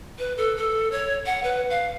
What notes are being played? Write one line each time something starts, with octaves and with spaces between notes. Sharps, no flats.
B4
A4
A4
C#5
F#5
B4
F5